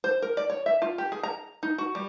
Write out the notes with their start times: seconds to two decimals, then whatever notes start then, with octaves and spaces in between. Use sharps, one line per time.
0.04 C5
0.22 A#4
0.37 D5
0.50 C#5
0.66 E5
0.82 F4
0.98 G4
1.12 G#4
1.23 A#5
1.63 D#4
1.78 F#4
1.95 G3